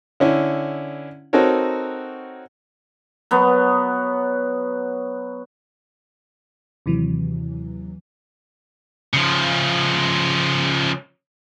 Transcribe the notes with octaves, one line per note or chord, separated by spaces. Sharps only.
D3 C#4 E4
C4 D#4 F#4 A4 A#4 C#5
F#3 B3
D#2 C3 E3 F#3
C#3 F3